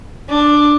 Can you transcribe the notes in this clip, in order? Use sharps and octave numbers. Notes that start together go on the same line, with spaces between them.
D4